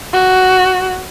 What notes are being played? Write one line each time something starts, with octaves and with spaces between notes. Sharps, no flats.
F#4